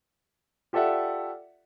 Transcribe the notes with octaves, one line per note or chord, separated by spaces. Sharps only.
F4 G4 A4 D5 E5 F#5